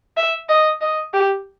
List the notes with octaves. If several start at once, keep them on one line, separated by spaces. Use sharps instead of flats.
E5
D#5
D#5
G4